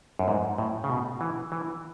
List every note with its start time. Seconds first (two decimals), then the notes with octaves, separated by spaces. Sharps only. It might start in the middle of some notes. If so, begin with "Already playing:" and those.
0.19 F#2
0.28 G#2
0.58 A2
0.84 C#3
0.90 B2
1.21 E3
1.52 E3